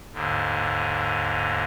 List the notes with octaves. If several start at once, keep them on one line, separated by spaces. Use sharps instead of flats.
D#2 G#2 D3